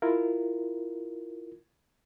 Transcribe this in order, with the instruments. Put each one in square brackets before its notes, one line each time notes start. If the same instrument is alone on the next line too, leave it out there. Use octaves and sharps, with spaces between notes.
[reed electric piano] E4 F4 A#4